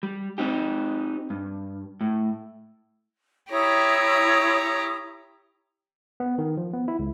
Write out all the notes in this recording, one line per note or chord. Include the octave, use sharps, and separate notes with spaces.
G3
C4 D#4 G4
G2
A2
E4 G4 C#5 A#5 D#6
B3
D#3
F3
B3
E4
C#2